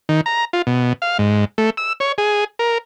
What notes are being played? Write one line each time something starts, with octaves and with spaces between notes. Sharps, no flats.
D#3
A#5
F4
B2
F5
G#2
A3
E6
C#5
G#4
A#4